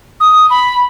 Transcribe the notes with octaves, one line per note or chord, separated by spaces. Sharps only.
D#6
B5